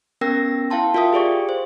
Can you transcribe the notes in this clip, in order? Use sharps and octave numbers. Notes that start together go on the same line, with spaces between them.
B3 C#4 A#4 G5 E6 A#6
E4 F5 G5 A5 C6
F4 A#4 E5 F5 G5 D#6
G4 G#4 D5 C#6
C5